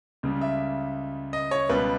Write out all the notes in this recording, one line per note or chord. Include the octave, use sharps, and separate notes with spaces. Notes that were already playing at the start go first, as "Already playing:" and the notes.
C#2 C#3 G3
E5
D#5
C#5
C#2 B2 G3 B4